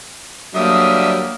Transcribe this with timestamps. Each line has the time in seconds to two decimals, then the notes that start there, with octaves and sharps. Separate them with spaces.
0.55 D3 F#3 G3 A#3 E5 D#6